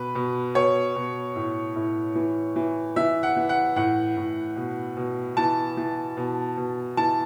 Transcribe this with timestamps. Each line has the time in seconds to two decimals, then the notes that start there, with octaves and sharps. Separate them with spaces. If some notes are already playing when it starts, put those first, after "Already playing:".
Already playing: B2 B4
0.15 B2
0.55 B2 C#5
0.96 B2
1.36 A2
1.76 A2
2.15 E3
2.56 E3
2.96 E3 E5
3.23 F#5
3.36 E3
3.49 F#5
3.76 A2 F#5
4.17 A2
4.56 B2
4.97 B2
5.37 E3 A5
5.77 E3
6.17 B2
6.57 B2
6.97 E3 A5